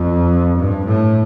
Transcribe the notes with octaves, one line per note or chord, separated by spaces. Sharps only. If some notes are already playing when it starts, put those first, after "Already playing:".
Already playing: F2
G2
A2